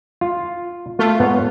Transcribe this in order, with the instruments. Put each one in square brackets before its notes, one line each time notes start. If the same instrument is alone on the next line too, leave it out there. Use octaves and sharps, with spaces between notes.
[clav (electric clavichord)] F4
[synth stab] A3 F4
[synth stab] G#2 [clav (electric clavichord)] B3 C#5